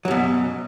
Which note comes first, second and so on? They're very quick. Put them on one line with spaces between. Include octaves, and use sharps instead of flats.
F#3 F#2 B2